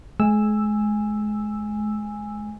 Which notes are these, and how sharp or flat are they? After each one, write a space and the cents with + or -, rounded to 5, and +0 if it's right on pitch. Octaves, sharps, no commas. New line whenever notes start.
G#3 +35 G#5 -10 E6 +0